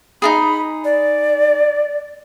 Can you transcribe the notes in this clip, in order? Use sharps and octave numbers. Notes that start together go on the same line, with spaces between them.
D#4 F#4 G#4 B5
D5